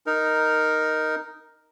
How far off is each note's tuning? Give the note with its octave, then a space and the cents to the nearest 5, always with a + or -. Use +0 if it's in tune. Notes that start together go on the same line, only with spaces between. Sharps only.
D#4 +0 A#4 +0